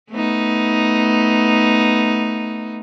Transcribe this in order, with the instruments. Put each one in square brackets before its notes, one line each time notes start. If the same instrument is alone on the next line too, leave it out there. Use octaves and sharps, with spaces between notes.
[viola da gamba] A3 B3 D#4